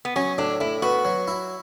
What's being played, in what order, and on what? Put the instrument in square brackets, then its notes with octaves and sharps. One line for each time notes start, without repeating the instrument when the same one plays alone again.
[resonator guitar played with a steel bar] B3
[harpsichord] F#3 [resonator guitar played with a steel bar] C#4
[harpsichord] A2 [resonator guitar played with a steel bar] D4
[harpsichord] A2 [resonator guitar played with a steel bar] E4
[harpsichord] B3 [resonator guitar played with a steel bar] F#4
[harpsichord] F#3
E4